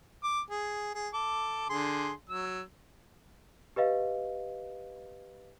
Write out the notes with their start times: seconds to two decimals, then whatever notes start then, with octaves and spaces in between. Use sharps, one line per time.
0.23 D6
0.50 G#4
0.95 G#4
1.14 A4 D6
1.69 D3 G#4 C6
2.30 F#3 E6
3.76 G4 B4 D#5 F5